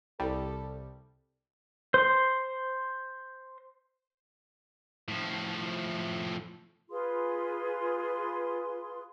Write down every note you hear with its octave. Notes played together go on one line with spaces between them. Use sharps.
C2 G3 A4
C5 C6
A2 F3
F4 G#4 B4 C6